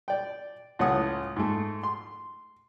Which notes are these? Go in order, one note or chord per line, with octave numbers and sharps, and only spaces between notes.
D5 G5
C#2 A2 C#5 F#5 D#6
G#2 A3
C6